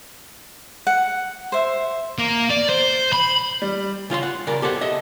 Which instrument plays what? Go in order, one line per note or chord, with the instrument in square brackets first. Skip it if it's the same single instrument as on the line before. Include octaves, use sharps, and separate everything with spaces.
[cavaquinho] F#5
C5 E5
[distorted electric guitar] A#3
D5
C5
B5
[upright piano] G3
[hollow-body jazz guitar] C#3 F4 D#5 C6
F#5
C#3 A#4 D5
G4 A4 C5 F#5
D#5 E5